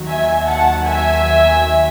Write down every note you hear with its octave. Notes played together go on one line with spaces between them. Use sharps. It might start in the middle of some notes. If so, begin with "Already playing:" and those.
Already playing: D#2 D#3 F#3
E5 G#5
F#5 A5
E5 G#5